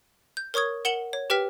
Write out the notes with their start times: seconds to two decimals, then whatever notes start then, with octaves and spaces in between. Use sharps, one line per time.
0.37 G6
0.54 A#4 C#5 C#6 D#6 G#6
0.85 A#4 F#5 C#7 E7 F#7 G7
1.13 C#5
1.30 G4 B4 G5 F6 B6